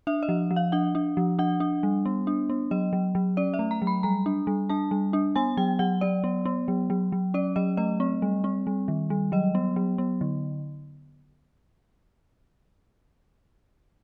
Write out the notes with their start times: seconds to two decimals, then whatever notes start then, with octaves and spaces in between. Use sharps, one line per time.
0.07 D4 E5
0.23 D#5
0.29 F3
0.51 F3
0.56 F5
0.72 D4 F#5
0.95 D4
1.17 F3
1.39 D4 F#5
1.60 D4
1.83 G3
2.05 B3
2.27 D4
2.50 B3
2.71 F#3 D#5
2.93 F#3
3.15 F#3
3.37 C#4 D5
3.54 E5
3.59 A3
3.71 A#5
3.82 F#3
3.87 B5
4.03 G3 A#5
4.26 D4
4.47 G3
4.70 D4 A5
4.91 G3
5.13 D4
5.36 B3 G#5
5.57 F#3 G5
5.79 F#3 F#5
6.01 F#3 D5
6.24 B3
6.45 B3
6.68 F#3
6.90 F#3
7.12 F#3
7.34 C#4 D5
7.56 F#3 D#5
7.77 A3 D#5
8.00 C4
8.22 G3
8.44 C4
8.67 G3
8.88 D#3
9.10 G3
9.32 F#3 D#5
9.55 B3
9.76 F#3
9.98 B3
10.21 D3